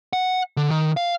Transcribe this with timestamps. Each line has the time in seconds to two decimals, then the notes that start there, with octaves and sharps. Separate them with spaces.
0.13 F#5
0.57 D3
0.71 D#3
0.97 F5